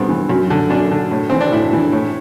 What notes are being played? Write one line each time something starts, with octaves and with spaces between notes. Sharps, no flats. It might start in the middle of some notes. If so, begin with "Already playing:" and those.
Already playing: G2 B3 C4 D4
E3
F#2
D3
F#2 D4
D3
A2
E3 C4
D4
A2 E4
E3
A2